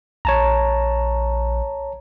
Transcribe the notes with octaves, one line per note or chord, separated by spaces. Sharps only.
A#1 C#5 A5 A#5